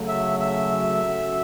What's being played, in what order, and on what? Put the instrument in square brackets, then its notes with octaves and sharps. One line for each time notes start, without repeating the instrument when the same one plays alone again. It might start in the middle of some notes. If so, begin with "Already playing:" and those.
Already playing: [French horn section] C#3 F#3 A3
[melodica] E5
E5
[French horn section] C#3 F#3 A3 C#4 F#4